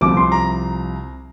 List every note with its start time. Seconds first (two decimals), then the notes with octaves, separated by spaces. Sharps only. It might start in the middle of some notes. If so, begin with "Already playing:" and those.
0.01 C2 C3 F3 D6
0.17 C6
0.32 A#5